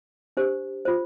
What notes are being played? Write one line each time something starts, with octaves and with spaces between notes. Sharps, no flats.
D4 G4 C5
F4 C5